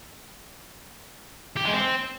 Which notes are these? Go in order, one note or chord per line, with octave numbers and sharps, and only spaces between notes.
G4
G#3
C4